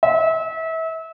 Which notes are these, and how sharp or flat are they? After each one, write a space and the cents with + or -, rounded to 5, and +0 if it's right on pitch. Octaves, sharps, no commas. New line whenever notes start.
E5 -30